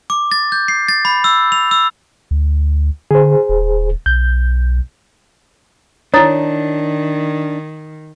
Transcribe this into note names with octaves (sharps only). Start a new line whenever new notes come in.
D6
A6
G6
C7
A6
B5
E6
F7
E6
D2
D3 G#4 C5
D#1
B1 G6
D#3 D4 E4 C#5 A#5 D#6 A6